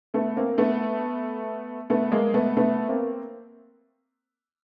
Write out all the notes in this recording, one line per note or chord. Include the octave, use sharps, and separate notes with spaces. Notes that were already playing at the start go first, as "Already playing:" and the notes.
A3 B3
A#3 C4
A3 B3
A3 B3
G#3 A#3
A3 B3
A3 B3
A#3 C4